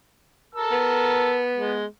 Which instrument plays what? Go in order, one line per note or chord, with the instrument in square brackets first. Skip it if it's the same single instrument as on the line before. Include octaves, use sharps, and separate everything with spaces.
[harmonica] A#4 A5 E6
[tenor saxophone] B3
[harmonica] G#3